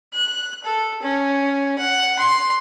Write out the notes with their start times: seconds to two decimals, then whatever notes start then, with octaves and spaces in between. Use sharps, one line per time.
0.13 F#6
0.64 A4
1.02 C#4
1.78 F#5
2.18 C6